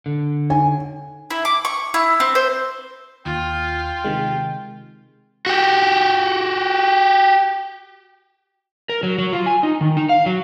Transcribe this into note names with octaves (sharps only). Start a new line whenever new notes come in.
D3
D#4 C#5 G#5
E4
D6
C#6
E4
C4
C5
D#2 F4 G5
C3 D#3 G#3
F#4 G4
A#4
F#3
F#3
F4
G#5
D#4
D#3
D#4
F5
F#3